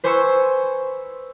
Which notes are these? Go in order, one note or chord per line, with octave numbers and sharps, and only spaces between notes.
B4 C5 G#5 C6 C#6 E6